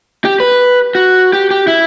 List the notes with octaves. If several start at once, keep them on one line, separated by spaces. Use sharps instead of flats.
G4
B4
F#4
G4
G4
E4